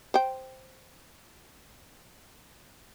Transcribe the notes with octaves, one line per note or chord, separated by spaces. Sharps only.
C5 G5